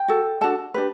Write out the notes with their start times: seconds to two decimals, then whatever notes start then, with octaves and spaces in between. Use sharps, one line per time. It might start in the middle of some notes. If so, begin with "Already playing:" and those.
Already playing: G5
0.08 F#4 A4
0.41 D4 F#4 A4 A5
0.74 D4 G4 B4